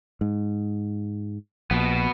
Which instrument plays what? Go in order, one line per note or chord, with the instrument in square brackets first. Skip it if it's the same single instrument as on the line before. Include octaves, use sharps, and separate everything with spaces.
[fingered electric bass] G#2
[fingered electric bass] A#1 [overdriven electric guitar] B2 B3